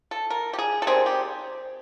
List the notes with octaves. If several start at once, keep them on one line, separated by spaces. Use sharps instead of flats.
A4
A#4
G4
G#4
A4
D#3 G3 C4 G#4
G4